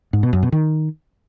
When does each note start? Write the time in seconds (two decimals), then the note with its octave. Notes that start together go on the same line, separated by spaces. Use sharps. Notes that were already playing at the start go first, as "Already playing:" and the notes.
0.13 G#2
0.23 B2
0.33 F#2
0.43 B2
0.52 D#3